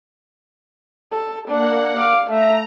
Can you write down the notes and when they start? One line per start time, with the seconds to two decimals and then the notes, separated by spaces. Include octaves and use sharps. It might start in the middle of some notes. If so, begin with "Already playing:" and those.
1.12 A4
1.48 A#3 D4 F#5
1.98 F5 D6
2.30 A3 E5 A#5